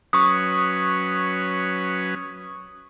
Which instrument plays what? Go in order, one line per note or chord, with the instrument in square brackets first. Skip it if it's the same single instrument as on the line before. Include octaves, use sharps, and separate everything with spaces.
[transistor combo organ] F#3 C#4 B4 [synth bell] C#6 D#6